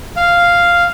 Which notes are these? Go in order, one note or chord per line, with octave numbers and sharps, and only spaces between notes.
F5